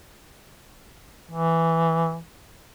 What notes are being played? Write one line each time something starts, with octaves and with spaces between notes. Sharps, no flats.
E3